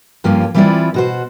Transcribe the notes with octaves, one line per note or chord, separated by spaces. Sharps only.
G2 F3 A#3 C#4
E3 G3 C4 E4 F4 D5
B2 F#4 C5